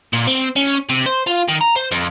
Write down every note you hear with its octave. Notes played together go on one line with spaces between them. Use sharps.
A#2
C4
C#4
C3
C5
F4
D#3
A#5
C5
F2